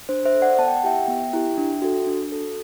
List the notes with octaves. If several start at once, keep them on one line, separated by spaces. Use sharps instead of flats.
D4 C5
C5 E5
A4
D5 F#5
B3 A5
G5
F#5
E4 G4 E5 G5
B3
E4 G4
D4
F#4 A4
D4
F#4 A4